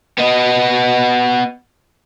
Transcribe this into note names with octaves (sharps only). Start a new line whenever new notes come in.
B3 D#5